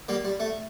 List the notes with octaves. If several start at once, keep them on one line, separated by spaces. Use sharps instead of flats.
G3 A#3
G3
A3